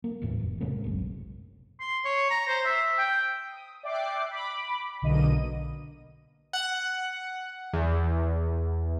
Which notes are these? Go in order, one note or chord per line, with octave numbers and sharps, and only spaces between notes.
A#3
D#1 D#2 A2 E3
F1
A2 C3 G#3 A#3
F#1 B1
C6
C#5
A#5
C5
E5
G5
D#6
D5 E5 G5 D6 F#6 C7
B5 D6
B1 B2 D3 A#3 D#5 D#7
F#5
E2